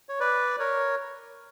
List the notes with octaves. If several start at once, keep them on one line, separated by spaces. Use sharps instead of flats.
C#5
B4 D5
A#4 C#5